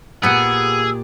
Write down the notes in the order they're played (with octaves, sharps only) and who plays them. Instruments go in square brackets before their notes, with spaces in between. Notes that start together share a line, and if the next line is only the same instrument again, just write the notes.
[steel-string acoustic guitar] A#2 G4 [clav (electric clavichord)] B3 F#5 [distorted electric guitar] G#4 [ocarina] E6